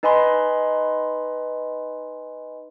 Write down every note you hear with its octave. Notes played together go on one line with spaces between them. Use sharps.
D#4 B4 D#5 G#5 B5 C6